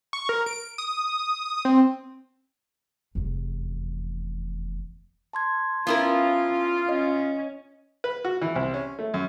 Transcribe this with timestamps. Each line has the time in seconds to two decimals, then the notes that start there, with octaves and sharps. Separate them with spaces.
0.13 C#6
0.29 A#4
0.46 D7
0.78 D#6
1.65 C4
3.15 F1 E2
5.33 A5 C6 G#6
5.87 B3 C#4 E4 F4 A#4
6.89 C#4 D#5
8.04 B4
8.25 F#4
8.42 E3
8.55 C2
8.74 C#4
8.99 A3
9.14 F#2